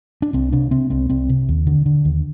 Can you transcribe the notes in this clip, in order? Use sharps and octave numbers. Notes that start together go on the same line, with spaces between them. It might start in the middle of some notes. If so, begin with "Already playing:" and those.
D4
C2 C4
C3 D4
C3 C4
C2 C4
C2 C4
C3
D#2
D3
D3
D#2